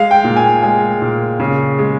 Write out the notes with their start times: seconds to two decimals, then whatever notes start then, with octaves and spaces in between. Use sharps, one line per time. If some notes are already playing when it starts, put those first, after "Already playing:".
Already playing: G#3 F5
0.11 G5
0.24 A#2
0.37 G#5
0.63 G#3 G#5
1.02 A#2
1.40 C#3
1.79 G#3